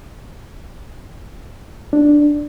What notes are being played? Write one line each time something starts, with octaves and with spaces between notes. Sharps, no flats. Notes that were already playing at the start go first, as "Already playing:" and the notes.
D4